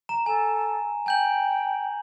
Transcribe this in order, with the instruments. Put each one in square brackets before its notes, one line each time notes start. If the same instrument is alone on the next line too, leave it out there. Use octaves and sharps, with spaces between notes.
[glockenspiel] A#5 E7
[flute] A4 [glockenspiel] G#5
[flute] G5 [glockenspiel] G#5 G6 F#7